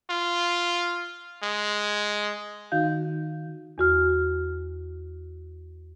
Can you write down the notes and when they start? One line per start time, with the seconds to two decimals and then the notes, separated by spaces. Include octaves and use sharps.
0.10 F4
1.43 G#3
2.72 D#3 D#4 F#4 F5 G6
3.78 E2 F#4 F6